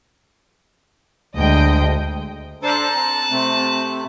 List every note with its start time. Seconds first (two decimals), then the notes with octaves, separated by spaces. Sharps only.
1.36 D2 G#3 D#5 G5
2.63 D4 A4 C5 A5 A#5 F#6
2.94 C4
3.30 C3 A3 C4